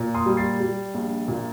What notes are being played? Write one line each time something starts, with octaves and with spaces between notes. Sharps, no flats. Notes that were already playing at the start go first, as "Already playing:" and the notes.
Already playing: A#2
C6 D#6
G3
A6 C7
G3
A#1
A#2